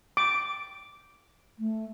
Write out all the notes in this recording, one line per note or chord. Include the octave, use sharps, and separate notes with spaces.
D6
A3